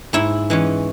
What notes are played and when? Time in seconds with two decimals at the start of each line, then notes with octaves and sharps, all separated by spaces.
0.13 G#2 E4
0.50 E3 G#3 C#4